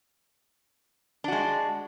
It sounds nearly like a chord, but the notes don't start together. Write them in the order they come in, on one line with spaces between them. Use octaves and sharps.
D4 F#4 G#3